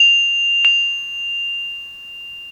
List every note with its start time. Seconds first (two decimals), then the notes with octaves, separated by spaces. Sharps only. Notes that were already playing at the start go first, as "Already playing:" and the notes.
Already playing: F7
0.65 F7